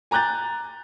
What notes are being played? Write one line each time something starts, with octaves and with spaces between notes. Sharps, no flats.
G#5 A#5 D6 F#6 G6 A6